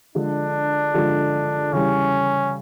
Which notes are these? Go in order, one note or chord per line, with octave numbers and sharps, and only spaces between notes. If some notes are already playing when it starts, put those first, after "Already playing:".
D3 F3 G#3 D4
D3 F3 G#3
C#3 E3 G3 C#4